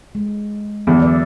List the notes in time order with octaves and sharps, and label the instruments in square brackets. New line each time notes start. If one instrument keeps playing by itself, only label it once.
[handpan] G#3
[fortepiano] E2 [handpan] D3 F#3
[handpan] B4 D5 E5